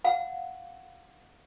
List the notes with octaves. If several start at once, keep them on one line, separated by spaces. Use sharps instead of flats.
F5 F#5